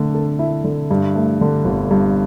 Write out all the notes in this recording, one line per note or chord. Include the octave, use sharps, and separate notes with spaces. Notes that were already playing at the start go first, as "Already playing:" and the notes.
Already playing: D3 A3
A4
E4
D3
G2
A3
D3
G1
G2